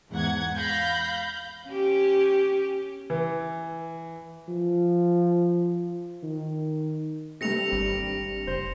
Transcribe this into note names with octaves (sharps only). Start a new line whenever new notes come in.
E2 G#2 F#5 G#6
F5 B5 G6 A#6
C#4 G4
E3
F3
D#3
G2 C3 A3 A#6 C#7 F7
G#1 G3
F#1 C5